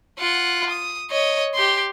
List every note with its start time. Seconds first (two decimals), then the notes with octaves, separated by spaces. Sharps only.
0.19 F4 F#5
0.70 D#6
1.11 C#5 D#5
1.55 G4 C6